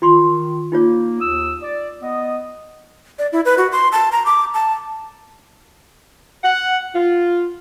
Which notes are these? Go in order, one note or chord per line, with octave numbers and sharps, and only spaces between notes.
D#3 F4 C6 C#6
A#3 D#4 F4 C#5
D#2 D#6 E6
D5
B3 D#5
D5
E4
B4
F#4
C6
A5
A#5
D6
A5
F#5
F4